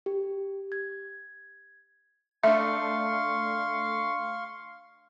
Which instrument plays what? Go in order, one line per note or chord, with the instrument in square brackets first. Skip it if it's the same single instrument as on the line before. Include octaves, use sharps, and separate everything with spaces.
[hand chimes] G4
G#6
[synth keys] A3 D4 [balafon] E5 [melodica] F5 C6 C#6